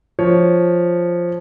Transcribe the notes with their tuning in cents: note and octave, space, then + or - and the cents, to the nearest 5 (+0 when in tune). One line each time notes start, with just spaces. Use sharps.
F3 +0 C#5 +0